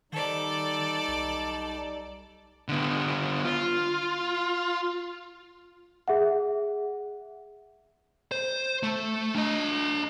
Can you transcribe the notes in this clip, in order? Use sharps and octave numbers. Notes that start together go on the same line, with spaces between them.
D#3 G3 D#4 A4 D5
B1
D3 B3
F4
G#4 E5 F#5
C5
A3
D4 D#5